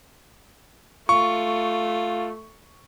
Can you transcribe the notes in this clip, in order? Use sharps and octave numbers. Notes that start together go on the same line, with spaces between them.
A3 F4 C#6